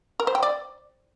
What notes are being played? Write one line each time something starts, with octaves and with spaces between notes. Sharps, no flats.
A#4
C5
G5
D5